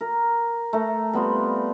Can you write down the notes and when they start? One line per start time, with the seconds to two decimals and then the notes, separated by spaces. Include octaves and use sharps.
0.01 A#4
0.73 A3 A#5
1.13 G3 B3 C4 F4